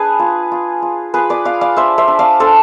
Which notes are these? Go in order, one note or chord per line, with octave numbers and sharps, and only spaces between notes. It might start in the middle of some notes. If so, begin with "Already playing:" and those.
Already playing: D4 G#4 B4
F4
F4
F4
F4 G#4 B4
B4 D5
F4 D5 F5
D5 F5
D4 C5 E5
C5 E5
D4
D5 F5
D4 A4 C5